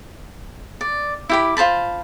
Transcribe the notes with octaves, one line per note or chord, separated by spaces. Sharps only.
D5
E4 G4 B5
F4 C5 A5 B5